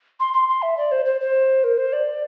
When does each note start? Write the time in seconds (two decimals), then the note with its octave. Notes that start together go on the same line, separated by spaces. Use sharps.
0.20 C6
0.34 C6
0.48 C6
0.62 E5
0.77 D5
0.92 C5
1.05 C5
1.21 C5
1.64 A#4
1.78 C5
1.93 D5